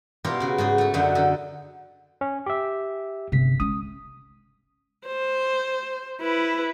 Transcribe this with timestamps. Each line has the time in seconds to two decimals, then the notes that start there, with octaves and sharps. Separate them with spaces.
0.24 B2 E4 F4 G4 A#4 E5
0.40 C#3 F#4
0.58 G#2 F#4 G#4 G5
0.78 A3 A4
0.94 F#2 D3 D#4 E5 F#5
1.15 D3 D#4
2.21 C#4
2.46 G4 E5
3.32 G1 C3 B6
3.60 G#3 C#4 D#6
5.06 C5
6.20 E4 B4